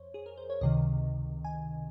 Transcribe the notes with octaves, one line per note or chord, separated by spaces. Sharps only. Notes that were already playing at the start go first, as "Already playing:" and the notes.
Already playing: F2 C5 C#5
G#4
A#4
C5
C#5
C#2 C3 D#3 D#5
G#5